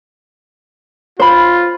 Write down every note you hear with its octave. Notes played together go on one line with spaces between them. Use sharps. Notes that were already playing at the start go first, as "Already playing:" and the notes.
F4 C5 B5